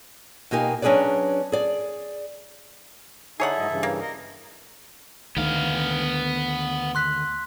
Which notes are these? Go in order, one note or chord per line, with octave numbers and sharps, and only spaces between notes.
B2 A#3 D#4 G4 G#5
F#3 C#4 D4 G#4 B4 D5
G#4 D5
D3 D#4 E4 G#4 A4 C#5 E5 F#5
G#2 F#3 D#5
G2 C#3 E3
A#3
A#4 D#5
D2 D#3 B3 F5
C6 F#6 B6